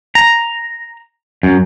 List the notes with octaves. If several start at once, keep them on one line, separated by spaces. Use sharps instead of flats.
A#5
F#2